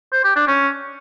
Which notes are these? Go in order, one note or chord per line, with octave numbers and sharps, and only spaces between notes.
C5
G4
D4
C#4